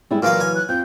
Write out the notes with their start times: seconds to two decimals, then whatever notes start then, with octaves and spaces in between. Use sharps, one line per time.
0.11 G3 G#3 E4
0.22 A#2 E3 F#3 A#3 F5 F6
0.40 G#5
0.55 F#6
0.69 F2 F3 G6